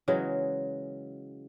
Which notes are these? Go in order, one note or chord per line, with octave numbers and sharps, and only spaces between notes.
C#3 E3 F#3 G#3